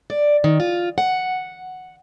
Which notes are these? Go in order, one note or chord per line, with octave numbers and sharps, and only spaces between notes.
D5
D#3
F4
F#5